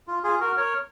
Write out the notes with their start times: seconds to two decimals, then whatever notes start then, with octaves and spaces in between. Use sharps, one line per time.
0.08 F4
0.23 F4 G#4
0.40 F#4 A#4
0.57 A#4 C#5